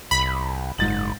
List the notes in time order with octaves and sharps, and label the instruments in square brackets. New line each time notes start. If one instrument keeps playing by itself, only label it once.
[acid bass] C2 [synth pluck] B5
[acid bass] F#1 [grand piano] G#2 A6 F#7